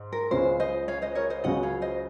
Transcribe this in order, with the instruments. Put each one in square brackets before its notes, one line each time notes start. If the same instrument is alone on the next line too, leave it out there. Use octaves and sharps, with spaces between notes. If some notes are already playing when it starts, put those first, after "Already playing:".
Already playing: [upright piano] G#2
[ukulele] A#4
[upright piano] C#2 C#3 G#3 C#4 F4 [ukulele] C5
[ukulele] C5 D#5
C#5 F5
C5 D#5
A#4 C#5
C5 D#5
[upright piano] C#2 C#3 F#3 C#4 F#4 [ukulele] D#5 F#5
[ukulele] C#5 F5
C5 D#5